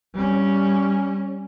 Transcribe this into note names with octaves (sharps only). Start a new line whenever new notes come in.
G3 C#4